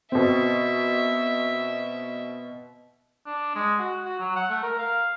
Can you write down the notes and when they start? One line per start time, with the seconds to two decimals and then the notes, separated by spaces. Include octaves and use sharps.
0.12 B2 C4 E5
3.26 D4
3.55 G#3
3.79 F#4
4.05 F#4
4.20 F#3
4.36 F#5
4.49 A3
4.63 A#4
4.78 F5